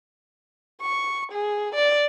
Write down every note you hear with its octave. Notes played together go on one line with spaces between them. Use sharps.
C#6
G#4
D5